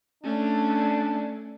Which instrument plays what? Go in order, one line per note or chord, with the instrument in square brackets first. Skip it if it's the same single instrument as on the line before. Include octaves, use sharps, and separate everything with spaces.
[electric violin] A3 C#4 [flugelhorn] D4